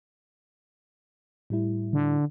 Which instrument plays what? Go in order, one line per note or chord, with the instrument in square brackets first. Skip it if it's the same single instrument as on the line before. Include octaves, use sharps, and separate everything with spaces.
[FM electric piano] A2 G3 E4
[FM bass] D3